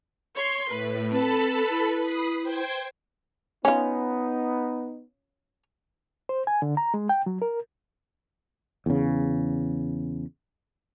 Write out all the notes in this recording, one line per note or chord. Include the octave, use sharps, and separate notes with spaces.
C#5 C6
A2 B4
C4 A4 B4 A5 B5
E4
B5 D#6 C7
C5 G5 G#6
B3 C#4 D#4 F4
C5
G#5
D3
A#5
G#3
G5
F#3
A#4
E2 C#3